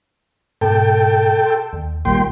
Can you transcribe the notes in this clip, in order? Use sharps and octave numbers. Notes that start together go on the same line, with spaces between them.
G#2 B2 A4 G5
C6 E6
D#2
A1 A#2 D#3 G3 G5 C6